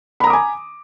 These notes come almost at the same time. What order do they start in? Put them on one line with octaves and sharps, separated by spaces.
B5 A#5 D#6 D6 G#5